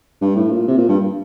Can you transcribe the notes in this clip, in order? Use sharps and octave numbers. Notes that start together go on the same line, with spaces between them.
G2
A2
A#2
C3
A#2
G2